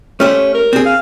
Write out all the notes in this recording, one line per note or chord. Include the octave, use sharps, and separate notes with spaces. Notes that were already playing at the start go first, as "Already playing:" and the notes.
A3 C#4 G4 C5
A#4
C4 G#4
F5